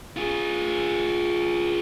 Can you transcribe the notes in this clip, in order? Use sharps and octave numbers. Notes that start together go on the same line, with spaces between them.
F4 G#4